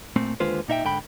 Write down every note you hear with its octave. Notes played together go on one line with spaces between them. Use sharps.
A#2 A3 C4
D#2 D3 G#3 F4 B4 C5
A#2 D#4 E5 G5
G#2 D3 G5 B5